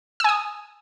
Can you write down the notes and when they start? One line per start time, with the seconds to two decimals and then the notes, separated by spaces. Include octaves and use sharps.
0.20 E6
0.24 G#5
0.29 D#6